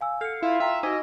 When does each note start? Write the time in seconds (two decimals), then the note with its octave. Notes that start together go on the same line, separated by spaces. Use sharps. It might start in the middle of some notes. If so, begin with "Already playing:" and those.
0.01 F5 G#5 E6
0.21 A4 F6 C7 C#7
0.42 E4 F4 F5
0.60 E5 G5 A#5 B6
0.83 D#4 F#4 D#5 G#5 E6 G#6